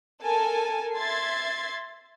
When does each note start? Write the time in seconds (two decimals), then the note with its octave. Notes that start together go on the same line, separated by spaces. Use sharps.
0.21 A4 A#4 G#5 A5
0.94 E5 C6 G#6 A6 C7